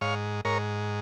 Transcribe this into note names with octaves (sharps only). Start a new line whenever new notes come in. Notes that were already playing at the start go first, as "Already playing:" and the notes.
G#2 C#5 F5
G#2 A#4 C#5